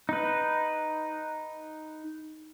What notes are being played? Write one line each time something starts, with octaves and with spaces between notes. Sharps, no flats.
D#4 B4